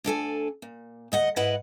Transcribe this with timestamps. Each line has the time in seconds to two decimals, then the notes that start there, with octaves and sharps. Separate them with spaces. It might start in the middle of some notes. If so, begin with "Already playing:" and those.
0.04 D2 D4 A4 G#5
0.62 A#2
1.12 D2 D#5 F#5
1.36 G#2 E4 B4 D#5 F#5